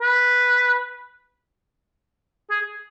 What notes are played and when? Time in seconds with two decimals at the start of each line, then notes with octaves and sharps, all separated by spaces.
0.01 B4
2.51 G#4